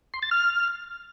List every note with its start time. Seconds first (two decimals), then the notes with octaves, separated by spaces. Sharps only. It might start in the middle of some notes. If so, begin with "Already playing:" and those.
0.14 C6
0.22 A6
0.31 F6